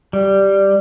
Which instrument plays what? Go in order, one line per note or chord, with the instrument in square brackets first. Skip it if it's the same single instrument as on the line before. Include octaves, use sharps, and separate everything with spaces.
[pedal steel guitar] G3